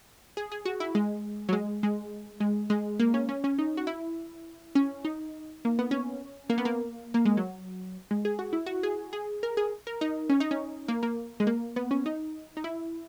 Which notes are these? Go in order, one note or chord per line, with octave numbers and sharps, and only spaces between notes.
G#4
G#4
F#4
E4
G#3
F#3
G#3
G#3
G#3
G#3
A#3
C#4
C#4
C#4
D#4
F#4
E4
C#4
D#4
A#3
B3
C#4
A#3
B3
A#3
A#3
G#3
F#3
G#3
G#4
F#4
E4
F#4
G#4
G#4
A#4
G#4
A#4
D#4
C#4
D#4
C#4
A#3
A#3
G#3
A#3
B3
C#4
D#4
D#4
E4